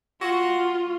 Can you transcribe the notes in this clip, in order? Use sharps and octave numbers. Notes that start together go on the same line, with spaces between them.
F4 F#4